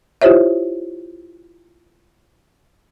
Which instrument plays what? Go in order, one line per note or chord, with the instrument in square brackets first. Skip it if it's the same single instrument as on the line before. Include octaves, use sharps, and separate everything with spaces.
[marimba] E4 F4 G4 C5 C#5 E5